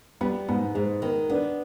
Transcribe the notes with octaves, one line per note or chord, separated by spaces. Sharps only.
G3 B3
G#2 B3
G#2 G#3
D#3 B3
B3 D4